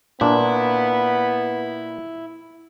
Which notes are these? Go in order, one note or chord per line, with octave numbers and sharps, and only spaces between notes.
A#2 B3 D4 E4